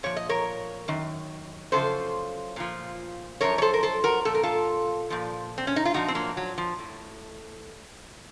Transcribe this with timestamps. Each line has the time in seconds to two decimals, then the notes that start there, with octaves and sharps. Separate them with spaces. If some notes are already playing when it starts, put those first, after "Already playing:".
0.03 A#2 F3 C#5
0.17 D#5
0.29 A#4 C#5
0.88 F#2 D#3
1.72 F#2 C#3 F3 A4 C5
2.56 A#2 F3
3.41 F#2 F3 A#4 C#5
3.58 C#5
3.62 A4 C5
3.74 A#4
3.83 A4 C5
4.04 F#4 A#4
4.25 A#2 F3 A4
4.35 A#4
4.43 F4 A4
5.10 A#2 F3
5.58 C4
5.67 C#4
5.76 D#4
5.85 F4
5.94 A#2 F3 D#4 F#4
6.08 C4
6.15 F#3 A#3
6.37 F#3
6.58 F3
6.79 A2